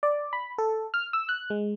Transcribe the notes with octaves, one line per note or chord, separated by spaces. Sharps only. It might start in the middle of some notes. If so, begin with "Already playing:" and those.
D5
B5
A4
F6
E6
F#6
G#3